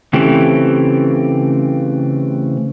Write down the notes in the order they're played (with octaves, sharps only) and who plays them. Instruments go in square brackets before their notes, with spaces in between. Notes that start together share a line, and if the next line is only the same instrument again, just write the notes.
[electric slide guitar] C#3 E3 A3 C4 G4